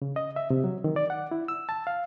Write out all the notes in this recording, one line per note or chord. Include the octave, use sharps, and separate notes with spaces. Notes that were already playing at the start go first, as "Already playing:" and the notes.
C#3
D#5
E5
C3
F#3
D#3
D5
F#5
E4
E6
A5
F5